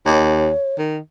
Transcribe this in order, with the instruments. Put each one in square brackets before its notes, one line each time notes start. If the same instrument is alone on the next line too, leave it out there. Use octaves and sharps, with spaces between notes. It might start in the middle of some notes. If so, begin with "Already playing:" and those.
[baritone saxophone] D#2 [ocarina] C#5
[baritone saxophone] D#3